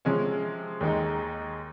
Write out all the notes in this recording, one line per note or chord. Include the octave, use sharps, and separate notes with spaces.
C3 F3 G#3 C#4
D#2 D#3 G#3 D#4